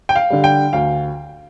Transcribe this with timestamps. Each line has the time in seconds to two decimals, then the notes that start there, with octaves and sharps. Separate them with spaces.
0.09 G5
0.16 F5
0.30 D3 G3
0.44 G5
0.73 D2 F5